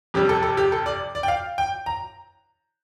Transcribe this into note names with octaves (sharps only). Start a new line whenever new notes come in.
F2 C3 G3 G4
A4
A4
G4
A4
D5
D5
G5
F5
G5
A#5